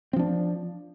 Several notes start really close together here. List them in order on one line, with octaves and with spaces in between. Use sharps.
C4 F3 D4